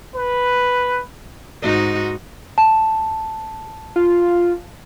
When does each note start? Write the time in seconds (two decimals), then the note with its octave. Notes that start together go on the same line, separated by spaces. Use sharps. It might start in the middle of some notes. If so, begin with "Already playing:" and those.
0.16 B4
1.61 G#2 D#4 F#4
2.58 A5
3.96 F4